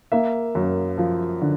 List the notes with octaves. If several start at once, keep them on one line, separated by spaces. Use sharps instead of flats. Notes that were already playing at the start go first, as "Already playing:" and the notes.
A#3 E5
F#2
F3
D3